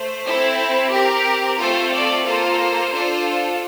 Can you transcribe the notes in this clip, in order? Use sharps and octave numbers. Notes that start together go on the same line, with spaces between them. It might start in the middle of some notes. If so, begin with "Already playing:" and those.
Already playing: A3 C5
C4 E4 A4
C4 G4 A#4
A3 C4 F4 A4 C5
D5
A#3 F4 A4 C5
D4 F4 A4